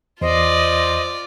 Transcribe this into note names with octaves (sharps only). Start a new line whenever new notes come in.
E2 F4 C5 D5 D#5